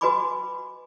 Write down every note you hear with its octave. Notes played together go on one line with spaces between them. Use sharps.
F#4 B4 D#5 G#5 B5 D6